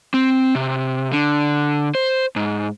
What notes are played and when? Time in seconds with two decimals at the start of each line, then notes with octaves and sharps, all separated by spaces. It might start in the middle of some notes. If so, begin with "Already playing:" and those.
0.14 C4
0.55 C3
1.11 D3
1.95 C5
2.36 G#2